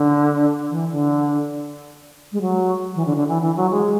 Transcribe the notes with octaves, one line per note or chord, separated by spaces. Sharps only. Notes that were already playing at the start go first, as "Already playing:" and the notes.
Already playing: D3
E3
D3
G#3
F#3
E3
D3
D3
E3
E3
F#3
G#3